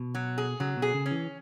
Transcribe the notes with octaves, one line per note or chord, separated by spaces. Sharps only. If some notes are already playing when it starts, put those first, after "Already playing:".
Already playing: B2
F#3
G#4
C#3 F#3
B2
G#4
C#3
C#4
E3